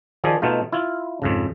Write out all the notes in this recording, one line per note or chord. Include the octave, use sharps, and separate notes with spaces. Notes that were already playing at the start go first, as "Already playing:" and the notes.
D#3 F3 G#4 D5
B2 A3 D#4 F4
E4 F4
F2 G#2 C#3